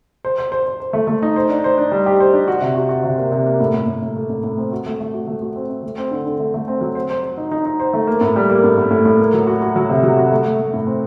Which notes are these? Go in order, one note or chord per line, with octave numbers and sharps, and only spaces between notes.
C5
C5
C5
C5
C5
A3
A3
D#4
C5
D4
C5
D4
G3
G4
C5
D4
F#4
C3
F#4
F#4
C3
A#3
C3
A#3
A2
A2
A2
A2
A3
A2
A2
C4
F#4
A3
A3
F#4
A3
F#4
C4
C4
A3
C4
D3
D3
A3
A3
C4
F#3
C5
C5
C5
D#4
D#4
D#4
C5
A3
A#3
A2
G3
A#3
A2
A2
A2
A2
A#3
F#3
F#4
F#4
F#3
C3
F#3
F#4
A3
A3
A3
A2
C4